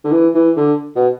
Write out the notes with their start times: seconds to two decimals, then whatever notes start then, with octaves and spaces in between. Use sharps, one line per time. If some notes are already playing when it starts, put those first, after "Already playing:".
0.04 D3
0.12 E3
0.35 E3
0.57 D3
0.96 B2